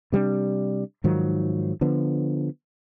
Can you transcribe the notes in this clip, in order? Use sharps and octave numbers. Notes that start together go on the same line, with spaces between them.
C3 G3 B3 D4
G#2 D#3 F3 F#3
D3 F3 B3